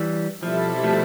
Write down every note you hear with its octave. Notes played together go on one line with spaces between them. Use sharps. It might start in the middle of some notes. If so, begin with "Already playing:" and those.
Already playing: E3 G3
B2 F3 G3 C4 E4 A4
F3 A3